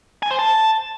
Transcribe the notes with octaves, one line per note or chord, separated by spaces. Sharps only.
G#5
C5
A5